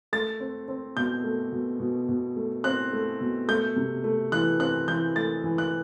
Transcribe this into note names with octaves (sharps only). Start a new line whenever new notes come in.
A3 A6
C4
C4
B2 G6
A3
B2
B2
B2
A3
C4 F#6
A3
B2
A3 G6
C3
A3
E3 F#6
C4 F#6
E3 G6
A3 A6
E3
F#6